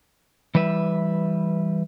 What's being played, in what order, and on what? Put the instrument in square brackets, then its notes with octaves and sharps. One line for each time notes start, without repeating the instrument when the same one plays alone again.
[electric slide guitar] E3 G3 B4 E5